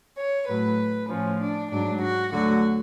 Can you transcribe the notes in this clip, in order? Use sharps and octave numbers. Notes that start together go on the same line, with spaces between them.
C#5
A2 F#3 B4
A2 F3 C#4
D4
G#2 F#3 D4
F#4
D2 D3 F#3 F#4